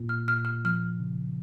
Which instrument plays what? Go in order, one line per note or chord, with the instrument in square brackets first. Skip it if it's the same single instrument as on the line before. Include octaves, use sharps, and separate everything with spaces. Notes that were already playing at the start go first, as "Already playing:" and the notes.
Already playing: [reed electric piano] A#2 A#3 F4
[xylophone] F6
[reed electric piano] A#2 [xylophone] F6
[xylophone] F6
[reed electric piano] F3 [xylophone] F6
[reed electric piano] C#3